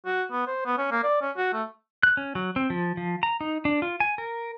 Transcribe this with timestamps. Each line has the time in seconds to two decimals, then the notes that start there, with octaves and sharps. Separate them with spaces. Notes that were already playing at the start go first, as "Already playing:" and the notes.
0.06 F#4
0.31 B3
0.47 C5
0.65 B3
0.77 C#4
0.91 A#3
1.03 D5
1.21 C#4
1.37 F#4
1.53 A3
2.03 F#6
2.17 C#4
2.35 F#3
2.56 C4
2.70 F3
2.97 F3
3.23 A#5
3.41 D#4
3.65 D4
3.82 F4
4.00 G#5
4.18 A#4